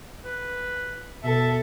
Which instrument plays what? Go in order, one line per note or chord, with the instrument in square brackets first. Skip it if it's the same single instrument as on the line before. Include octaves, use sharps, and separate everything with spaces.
[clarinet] B4
[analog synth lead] B2 [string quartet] A4 [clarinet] E5